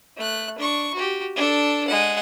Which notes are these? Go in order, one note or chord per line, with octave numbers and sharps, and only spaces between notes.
A3 F#6
D4 C#6
F#4 G4
D4 A4
G#3 F#5